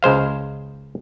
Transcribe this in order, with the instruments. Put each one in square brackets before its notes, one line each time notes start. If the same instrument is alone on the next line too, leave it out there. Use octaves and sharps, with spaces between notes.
[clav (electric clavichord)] C#2 G#3 C5 F5